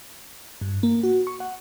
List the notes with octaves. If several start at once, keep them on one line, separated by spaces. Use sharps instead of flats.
G2
A#3
F#4
C#6
F#5